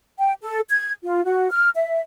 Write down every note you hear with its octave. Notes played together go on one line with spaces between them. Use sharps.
G5
A4
G#6
F4
F#4
F6
E5